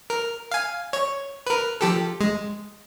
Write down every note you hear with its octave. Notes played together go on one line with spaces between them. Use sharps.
A#4
F5 G#5
C#5
A#4 B4
F3 G4 A4
G#3